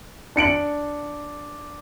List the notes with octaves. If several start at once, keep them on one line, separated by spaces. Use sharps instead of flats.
D4 C#7 D7 F#7